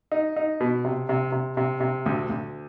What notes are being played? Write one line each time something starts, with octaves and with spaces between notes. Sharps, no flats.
D#4
D#4
B2
C3
C3
C3
C3
C3
D2
D2